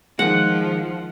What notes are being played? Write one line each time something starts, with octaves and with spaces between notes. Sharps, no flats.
D#3 F3 G#3 F#5